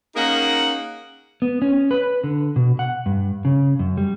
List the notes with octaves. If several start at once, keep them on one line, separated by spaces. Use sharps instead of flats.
A#3 C#4 D#4 G#4 A#4 F#5
B3
C#4
B4
D3
B2
F#5
G2
C#3
F#2
G3